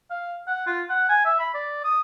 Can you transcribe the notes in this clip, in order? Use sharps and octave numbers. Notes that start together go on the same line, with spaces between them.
F5
F#5
F4
F#5
G#5
E5
B5
D5
D#6